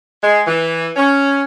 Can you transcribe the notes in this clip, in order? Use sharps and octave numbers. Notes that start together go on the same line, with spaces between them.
G#3
E3
C#4